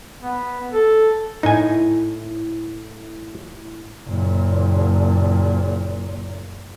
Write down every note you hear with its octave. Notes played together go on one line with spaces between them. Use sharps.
B3
A4
A2 D#4 E4 G#5
F#1 A#2